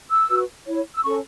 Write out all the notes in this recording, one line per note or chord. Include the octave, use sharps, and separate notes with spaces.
E6
F#4 B4
E4 C#5
E6
C#4 A4 C#5 C#6